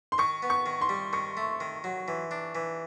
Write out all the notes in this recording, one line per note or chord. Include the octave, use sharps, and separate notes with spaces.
C6
D#3 C#6
B3
C#6
D#3
C6
G3
D#3 C#6
A3
D#3
F#3
E3
D4
E3